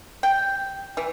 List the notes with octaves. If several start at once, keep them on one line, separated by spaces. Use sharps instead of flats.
G5
E3